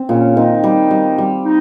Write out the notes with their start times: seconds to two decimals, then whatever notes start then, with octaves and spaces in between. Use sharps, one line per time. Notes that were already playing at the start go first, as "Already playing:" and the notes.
Already playing: C4
0.09 A#2 C#3 C#4
0.36 D#3 C4 D#4
0.64 G3
0.91 G3
1.18 G3
1.45 D#4